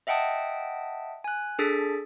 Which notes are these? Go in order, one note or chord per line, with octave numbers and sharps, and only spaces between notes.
D#5 E5 F#5 G5 A5 D#6
G#5 F#6
D4 G#4 A4 A6 B6